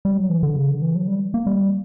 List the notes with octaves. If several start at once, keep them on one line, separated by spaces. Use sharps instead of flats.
G3
F#3
E3
D3
C#3
D3
E3
F#3
G3
A#3
G3